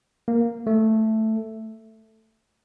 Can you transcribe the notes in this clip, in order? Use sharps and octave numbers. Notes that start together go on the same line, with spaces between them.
A#3
A3